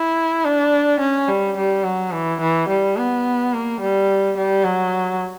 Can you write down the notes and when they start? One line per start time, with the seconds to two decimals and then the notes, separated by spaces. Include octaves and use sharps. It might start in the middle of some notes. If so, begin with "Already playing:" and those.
Already playing: E4
0.44 D4
1.00 C#4
1.28 G3
1.57 G3
1.84 F#3
2.13 E3
2.41 E3
2.69 G3
2.97 B3
3.53 A#3
3.80 G3
4.37 G3
4.64 F#3